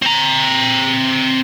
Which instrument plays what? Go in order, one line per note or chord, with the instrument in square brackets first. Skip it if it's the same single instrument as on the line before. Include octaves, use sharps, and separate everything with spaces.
[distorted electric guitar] C4 A#5